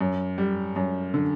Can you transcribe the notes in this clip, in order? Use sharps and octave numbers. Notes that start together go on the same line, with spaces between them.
F#2
G3
F#2
D3